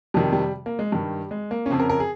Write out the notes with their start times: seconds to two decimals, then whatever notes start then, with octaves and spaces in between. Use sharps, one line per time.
0.14 F2 C3 D#3 G3
0.33 G3
0.66 A#3
0.79 G#3
0.92 G2 D#3 G3
1.31 G#3
1.51 A#3
1.66 C#4
1.70 F2 C#3 C4
1.80 A#4
1.90 A#4
2.00 G#4